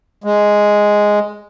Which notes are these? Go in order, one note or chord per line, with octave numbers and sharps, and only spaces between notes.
G#3